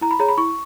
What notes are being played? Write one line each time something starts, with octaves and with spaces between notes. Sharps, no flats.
E4 A#5
B5
G#4 C#5 A#5
B5
E4 C#6